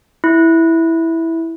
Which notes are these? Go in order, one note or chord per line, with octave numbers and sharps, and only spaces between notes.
E4